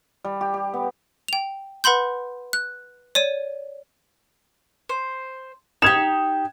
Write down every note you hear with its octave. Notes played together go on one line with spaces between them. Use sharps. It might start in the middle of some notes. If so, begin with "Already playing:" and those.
G3
G4
G4
B3
G5 F7
B4 F#5 B5 C6 G6
F#6
C#5 D5 D#7
C5
D#4 G4 G#6 E7